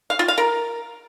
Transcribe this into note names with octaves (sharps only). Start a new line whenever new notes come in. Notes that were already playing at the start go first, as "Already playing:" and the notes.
F5
F4
F5
A#4